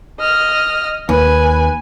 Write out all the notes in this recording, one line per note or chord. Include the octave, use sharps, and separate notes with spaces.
D#5 F6
D#2 B4 G#5